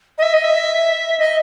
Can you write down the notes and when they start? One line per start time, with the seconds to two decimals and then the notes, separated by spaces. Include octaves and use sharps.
0.18 D#5
0.22 E5
0.33 D#5
0.44 E5
1.19 D#5